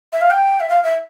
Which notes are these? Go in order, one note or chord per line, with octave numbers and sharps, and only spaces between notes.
E5
F5
G5
E5
F5
E5